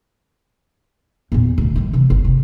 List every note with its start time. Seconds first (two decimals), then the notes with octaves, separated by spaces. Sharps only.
1.32 E2 A#2
1.58 E1 D2
1.76 D#3 G3
1.93 C3 E3
2.10 G1
2.24 C3